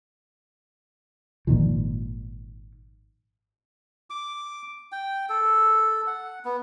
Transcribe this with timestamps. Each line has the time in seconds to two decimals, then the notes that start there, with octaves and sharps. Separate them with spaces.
1.47 G#1 A#2 D#3 F3
4.10 D6
4.92 G5
5.29 A4
6.07 F#5
6.45 B3